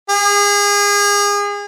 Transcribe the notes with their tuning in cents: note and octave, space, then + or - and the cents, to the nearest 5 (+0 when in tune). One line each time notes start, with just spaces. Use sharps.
G#4 -30